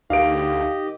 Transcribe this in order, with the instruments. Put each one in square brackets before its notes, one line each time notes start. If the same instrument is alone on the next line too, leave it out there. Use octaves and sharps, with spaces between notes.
[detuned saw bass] D2 [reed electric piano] D#4 A#4 [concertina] G4 D#5 [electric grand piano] F5 D7